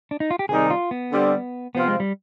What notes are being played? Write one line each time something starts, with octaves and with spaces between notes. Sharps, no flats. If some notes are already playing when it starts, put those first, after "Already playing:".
D4
D#4
F4
G4
C3 D#3 G3 C4 D#4 G#4
F4
B3
D3 G3 C4
C3 F3 B3 C4 F4
G#3
G3